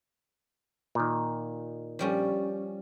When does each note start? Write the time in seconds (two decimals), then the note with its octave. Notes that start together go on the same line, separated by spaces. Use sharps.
0.95 A#2 D#3
1.99 F3 G3 C#4